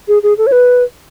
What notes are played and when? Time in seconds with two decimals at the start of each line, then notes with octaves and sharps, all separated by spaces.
0.08 G#4
0.23 G#4
0.38 A4
0.47 C#5
0.52 B4